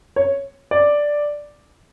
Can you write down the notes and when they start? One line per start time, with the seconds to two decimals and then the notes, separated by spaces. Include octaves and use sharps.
0.16 C#5
0.71 D5